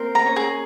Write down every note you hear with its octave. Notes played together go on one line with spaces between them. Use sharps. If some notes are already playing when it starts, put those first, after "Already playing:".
Already playing: A#3 C4 A#4 C5
A#5
C#4 C#5
G#4